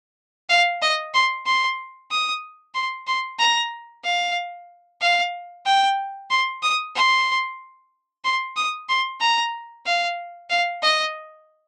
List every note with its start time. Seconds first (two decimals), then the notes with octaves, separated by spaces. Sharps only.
0.49 F5
0.82 D#5
1.14 C6
1.46 C6
2.11 D#6
2.75 C6
3.07 C6
3.39 A#5
4.04 F5
5.01 F5
5.66 G5
6.30 C6
6.63 D#6
6.95 C6
8.24 C6
8.56 D#6
8.89 C6
9.20 A#5
9.86 F5
10.50 F5
10.82 D#5